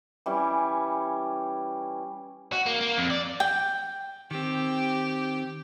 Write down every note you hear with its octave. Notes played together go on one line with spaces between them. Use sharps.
E3 G3 C#4
F#4
A#3
A#3
F2
D5
G5
D#3 C4 G4